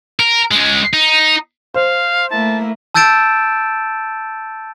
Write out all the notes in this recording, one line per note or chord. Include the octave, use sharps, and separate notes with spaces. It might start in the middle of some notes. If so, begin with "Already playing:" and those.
A#4
C#2 G#3
D#4
C5 F5
A3 A#3 E4 A5
A5 E6 G6 A6 D7 E7